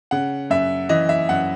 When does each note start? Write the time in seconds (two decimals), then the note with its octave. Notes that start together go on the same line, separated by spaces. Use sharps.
0.11 C#3 F#5
0.50 F#2 E5
0.89 E3 D#5
1.09 E5
1.29 F#2 F#5